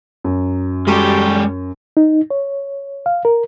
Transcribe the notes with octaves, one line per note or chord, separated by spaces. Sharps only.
F#2
G3 G#3 F#4 G4 A4
D#4
C#5
F5
A#4